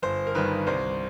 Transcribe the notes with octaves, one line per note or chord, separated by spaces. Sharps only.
G1 C5
A#4
G2 D#3 B4
C2 C5